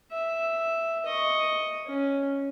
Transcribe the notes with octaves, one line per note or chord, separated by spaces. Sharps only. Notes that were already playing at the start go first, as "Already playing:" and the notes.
E5
D#5 C#6
C#4